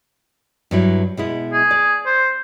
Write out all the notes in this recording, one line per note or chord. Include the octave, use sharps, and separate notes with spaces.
G2 F#3 E4
B2 G#3 E4
G#4
D5
C5